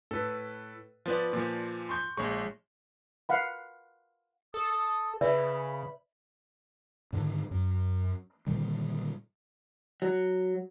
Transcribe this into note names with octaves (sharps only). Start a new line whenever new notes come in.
A2 A4 B4
F3 B3 F4 B4 D5
A#2 F3
C6 C#6 G6
A#1 G#3 C#5 C#6
F5 F#5 B5
A4 D#6
C#3 B4 D5 E5 B5
G#2 D3 D#3
F#2
A#2 D3 D#3 G3
F#3